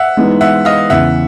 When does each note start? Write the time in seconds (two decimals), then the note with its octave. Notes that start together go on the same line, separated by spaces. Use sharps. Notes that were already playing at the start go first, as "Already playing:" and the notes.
Already playing: E5 F#5
0.17 E3 G#3 B3 D#4
0.41 E5 F#5
0.65 D#5 F5
0.90 E2 C#3 E3 E5 F#5